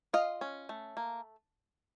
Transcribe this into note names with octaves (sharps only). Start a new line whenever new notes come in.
F4 D#5 F5
C#4
A3
A#3